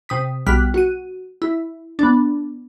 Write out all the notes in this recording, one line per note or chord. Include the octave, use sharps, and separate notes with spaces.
C3 D#6 B6
B1 G3 F6 F#6 B6
F#4 D#7
E4
B3 D4